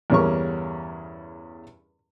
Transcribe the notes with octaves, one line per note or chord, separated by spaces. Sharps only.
E2 G2 C#3 C#4 A#4 C#6